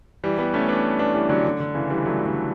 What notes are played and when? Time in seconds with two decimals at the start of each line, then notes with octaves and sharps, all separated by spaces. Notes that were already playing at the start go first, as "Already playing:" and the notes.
0.23 E3 G3
0.38 G3 B3
0.54 A3 C#4
0.68 B3 D4
0.99 B3 D4
1.14 E3 G3
1.29 D3 F#3
1.44 D3
1.60 D3
1.75 C#3 E3
1.90 E3 G3
2.05 F#3 A3
2.25 D3 F#3